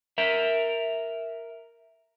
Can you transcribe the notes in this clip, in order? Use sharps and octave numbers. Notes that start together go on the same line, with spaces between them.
A#4 E5